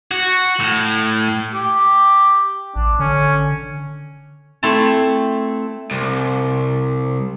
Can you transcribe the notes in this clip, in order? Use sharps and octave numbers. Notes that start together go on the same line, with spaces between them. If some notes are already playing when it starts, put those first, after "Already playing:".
F#4
A2
G4
A1 D4
D3 C#4
A3 C4 E4 A5
C2